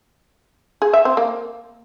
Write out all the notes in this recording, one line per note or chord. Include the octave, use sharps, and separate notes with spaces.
G#4
E5
C4
A#3